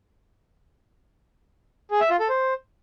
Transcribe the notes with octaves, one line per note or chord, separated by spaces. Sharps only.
G#4
E5
F4
A4
C5